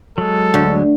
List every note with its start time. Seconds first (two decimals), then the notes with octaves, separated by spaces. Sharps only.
0.18 F#3 G#3 A4
0.54 D2